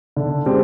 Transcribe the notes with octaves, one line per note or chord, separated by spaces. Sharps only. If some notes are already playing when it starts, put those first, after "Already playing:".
D3
G#3 C4 G4